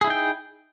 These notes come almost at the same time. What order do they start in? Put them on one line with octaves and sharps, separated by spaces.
G#4 E4 D#4 G5